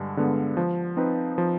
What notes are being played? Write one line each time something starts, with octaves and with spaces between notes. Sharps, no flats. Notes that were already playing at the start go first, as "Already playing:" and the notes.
Already playing: G2 D3 G#3
D3 G#3 B3
F3
C4 D#4 B4
F3